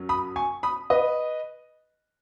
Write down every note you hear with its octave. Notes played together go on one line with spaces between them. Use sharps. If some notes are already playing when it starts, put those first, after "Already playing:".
Already playing: F#2 F#3 C#4
B5 D#6
G#5 C#6
B5 D#6
B4 D#5